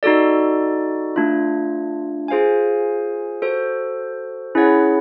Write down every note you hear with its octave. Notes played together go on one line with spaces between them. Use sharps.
D#4 F#4 A4 D5
A3 D4 F4
F4 G#4 C5 F5 G#5
F#4 A4 C5
C#4 E4 G#4 C#5 F#5